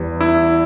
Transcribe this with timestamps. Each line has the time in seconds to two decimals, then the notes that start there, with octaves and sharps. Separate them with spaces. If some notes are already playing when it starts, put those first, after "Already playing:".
Already playing: E2 E3 G3
0.21 E4